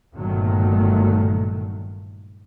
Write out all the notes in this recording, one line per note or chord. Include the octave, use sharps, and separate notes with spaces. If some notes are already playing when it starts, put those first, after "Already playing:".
G1 A#2 D#3 F#3 A3